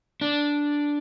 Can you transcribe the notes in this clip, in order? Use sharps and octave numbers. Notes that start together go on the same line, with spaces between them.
D4